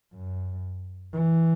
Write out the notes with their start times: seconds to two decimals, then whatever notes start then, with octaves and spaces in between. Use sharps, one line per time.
0.14 F#2
1.13 E3